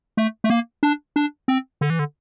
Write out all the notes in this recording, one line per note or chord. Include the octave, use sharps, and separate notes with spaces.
A3
A3
A#3
D4
D4
C4
D3
E3
D3